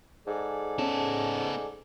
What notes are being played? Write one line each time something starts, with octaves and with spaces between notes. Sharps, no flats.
G#2 G#4 A4 D5
B3 C#4 A5